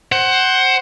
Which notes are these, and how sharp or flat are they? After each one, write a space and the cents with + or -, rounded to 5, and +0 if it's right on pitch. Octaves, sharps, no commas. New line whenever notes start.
C5 +20 F#5 +20